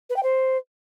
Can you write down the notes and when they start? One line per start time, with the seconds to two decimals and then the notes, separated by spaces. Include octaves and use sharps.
0.10 B4
0.16 G5
0.23 C5